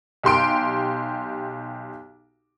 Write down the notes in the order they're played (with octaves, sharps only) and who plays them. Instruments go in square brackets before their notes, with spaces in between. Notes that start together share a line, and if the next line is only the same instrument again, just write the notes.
[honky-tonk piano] B1 G4 C6 D7